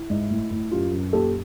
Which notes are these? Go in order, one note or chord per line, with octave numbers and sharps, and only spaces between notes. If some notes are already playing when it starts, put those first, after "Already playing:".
Already playing: E4
G#2
A2
A2
F#2 F4 G4
F#2
A#2 G4 A4